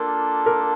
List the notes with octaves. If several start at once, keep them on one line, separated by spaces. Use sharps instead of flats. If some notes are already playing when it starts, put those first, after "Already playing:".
Already playing: A#3 D4 F4 A4 A#4
A#4